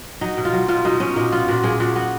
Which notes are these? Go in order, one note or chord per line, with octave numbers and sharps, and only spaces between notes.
F#3 D#4
B2
F4
F#3
B2 F4
B2 D#4
B2 C#4
A#2 D#4
B3 F4
A#2 F#4
A#2 G#4
A#2 F#4
B3 F#4